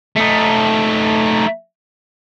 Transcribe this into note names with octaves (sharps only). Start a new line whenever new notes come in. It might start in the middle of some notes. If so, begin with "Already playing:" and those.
A3 D#4